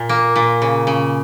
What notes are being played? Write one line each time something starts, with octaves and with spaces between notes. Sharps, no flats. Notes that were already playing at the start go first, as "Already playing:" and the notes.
Already playing: A#2
A#3
A#2
C#3
C#3